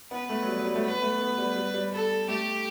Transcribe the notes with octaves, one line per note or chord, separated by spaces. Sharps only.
B3 B4
A3
F#3
G3
F#3
G3
A3
B3 B4
A3
B3
G3
G3
G3
A4
A3 G4